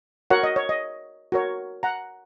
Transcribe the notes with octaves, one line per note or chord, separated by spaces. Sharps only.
F#4 A#4 C#5 F#5
D#5
C#5
D#5
F#4 A#4 C#5
F#5 A#5